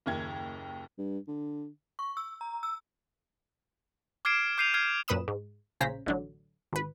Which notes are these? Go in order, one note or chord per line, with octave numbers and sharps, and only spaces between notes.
F#1 D#2 G#6
G2
D3
C#6
E6
A#5
E6
D6 F6 G#6 C7 D7 E7
D6 G6 C7 D#7 F7
F6 G#6 C7
F#2 A#2 B4 B5 D#6 E7
G#2
A#1 C#3 C5 C#5 A#5 B6
A1 D3 F#3
G#1 B4